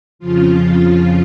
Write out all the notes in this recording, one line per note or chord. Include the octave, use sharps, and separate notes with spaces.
F2 C#3 F3 F4